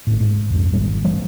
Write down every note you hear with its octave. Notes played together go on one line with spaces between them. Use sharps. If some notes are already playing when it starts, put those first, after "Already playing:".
G#1 A2
G#2
C2 F2 G#2
G#1 C#2 G3
G2 E3 G3